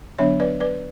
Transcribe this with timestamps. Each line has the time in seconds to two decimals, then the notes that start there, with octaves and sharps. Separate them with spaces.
0.19 D3 F#3 B3 D4 C#5 E5
0.40 B4 D5
0.60 B4 D5